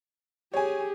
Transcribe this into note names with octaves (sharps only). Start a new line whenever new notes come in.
G4 G#4 C#5 G#5